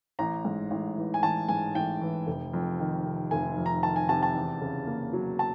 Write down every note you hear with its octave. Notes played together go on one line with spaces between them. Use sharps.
A1 A#5
G#2
A1
E3
G#5
A1 A5
G#2 G#5
A1 G5
E3
F1
F2
D#3
C3
F1 G#5
F2
A#5
D#3 A5
G#5
C3 A5
A5
E2
C#3
A#3
F#3
A5